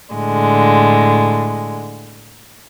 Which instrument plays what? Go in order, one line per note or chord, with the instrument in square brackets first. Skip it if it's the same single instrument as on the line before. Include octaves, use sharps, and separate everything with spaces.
[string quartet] A2 D3 G#3